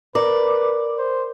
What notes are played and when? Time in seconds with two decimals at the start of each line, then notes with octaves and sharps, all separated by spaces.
0.15 A#4 B4 D5
0.98 C5